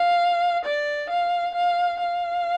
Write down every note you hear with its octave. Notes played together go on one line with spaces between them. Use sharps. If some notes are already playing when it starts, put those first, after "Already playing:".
Already playing: F5
D5
F5
F5
F5